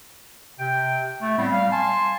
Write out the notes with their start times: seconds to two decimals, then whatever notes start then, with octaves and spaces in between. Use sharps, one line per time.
0.58 C3 G5
1.21 A3
1.37 A2 G3 B3 C4 B5
1.52 G3 F5
1.72 G#5 A5 C6